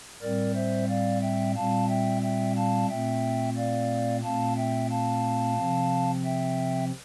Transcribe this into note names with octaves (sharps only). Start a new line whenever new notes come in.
A2 G3 C4 A#4 D5
C5 E5
D5 F5
E5 G5
A#2 G3 C4 F5 A5
E5 G5
E5 G5
F5 A5
A#2 A3 C4 E5 G5
D5 F5
A#2 A3 C4 F5 A5
E5 G5
F5 A5
C3 F3 C4
E5 G5